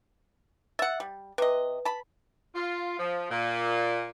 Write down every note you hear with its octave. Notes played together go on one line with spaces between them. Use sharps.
E5 F#5 A6
G3
C3 B4 D#5
A5 B5
F4
F3
A#2